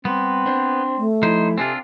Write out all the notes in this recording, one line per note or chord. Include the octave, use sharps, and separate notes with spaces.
G3 B3 C4
D4 C5
A3
F3 D#4 E4 C5
C3 C4 D4 F4 A4 G#5